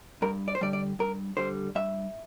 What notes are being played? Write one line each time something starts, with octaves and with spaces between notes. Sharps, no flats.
G2 A#4
D5
C5
D3 G3 D5
D5
G2 A#4
D3 G3 C5
G2 E5